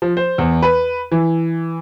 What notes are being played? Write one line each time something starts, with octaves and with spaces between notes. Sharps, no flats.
F3
C5
E2
B4
E3